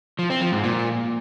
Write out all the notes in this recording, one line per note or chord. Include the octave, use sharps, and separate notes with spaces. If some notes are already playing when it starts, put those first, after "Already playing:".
F3
C4
F3
G#2
A#2